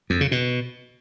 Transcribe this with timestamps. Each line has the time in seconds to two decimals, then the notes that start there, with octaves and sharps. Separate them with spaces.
0.10 F2
0.21 C#3
0.31 B2